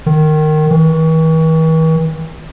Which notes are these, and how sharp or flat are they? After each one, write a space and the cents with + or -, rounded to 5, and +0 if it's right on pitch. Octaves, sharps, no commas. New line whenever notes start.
D#3 -15
E3 -45